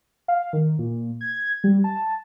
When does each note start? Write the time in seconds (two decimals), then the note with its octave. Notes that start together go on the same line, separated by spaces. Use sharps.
0.28 F5
0.53 D#3
0.79 A#2
1.21 G#6
1.64 G3
1.84 A5